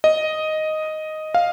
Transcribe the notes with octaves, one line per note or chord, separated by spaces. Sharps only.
D#5
F5